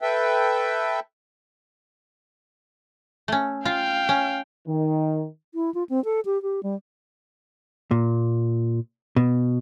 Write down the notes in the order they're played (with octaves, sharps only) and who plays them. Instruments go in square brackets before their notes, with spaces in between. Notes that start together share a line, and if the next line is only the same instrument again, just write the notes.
[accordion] A4 B4 E5 G5
[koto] A3 C#4
[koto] F4 [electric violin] F5 G5
[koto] C#4
[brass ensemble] D#3
[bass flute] E4
F4
C4
A4
G4
G4
G3
[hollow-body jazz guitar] A#2
B2